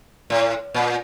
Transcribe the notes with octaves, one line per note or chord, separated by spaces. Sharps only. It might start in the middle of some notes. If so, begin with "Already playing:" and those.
A2
A#2